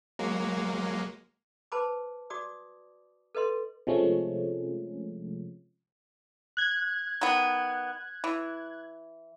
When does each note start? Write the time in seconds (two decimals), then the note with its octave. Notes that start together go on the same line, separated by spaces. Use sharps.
0.19 F#3 G#3 A#3
1.72 B4 C5 A5 B5 D6
2.30 F#4 D5 D6 D#6
3.35 A4 B4 D#5 C6
3.87 C3 F3 G#3 A3 C#4
6.57 F#6 G#6
7.21 D#3 B3
8.24 E3